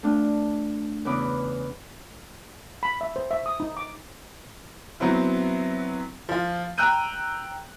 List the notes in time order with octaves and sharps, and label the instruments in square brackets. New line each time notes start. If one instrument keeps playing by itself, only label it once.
[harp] A3 D4 F4
E2 C#3 E4 B4 D6 D#6
[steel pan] B5
E5
C5
E5
D#6
D#4
D6
[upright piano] F#3 B3 C4 E4
F3 F4
G5 A#5 E6 F#6 G6 D#7